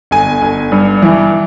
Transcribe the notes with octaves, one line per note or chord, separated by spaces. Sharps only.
G1 G#5
G1
G2
E3